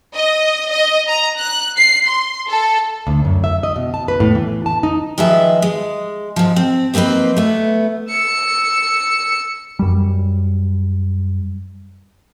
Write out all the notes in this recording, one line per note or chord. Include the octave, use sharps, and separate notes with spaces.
D#5
D#5
A#5
F#6
C7
C6
A4
D2
F#2
E5
D#5
B2
A5
B4
A2
E3
A5
D#4
D#3 F3 G#3 B4 E5
G#3
G#2 F3
C4
F3 A#3 C4 D#4 B4
A3 B3
E6 C#7
F#2 G3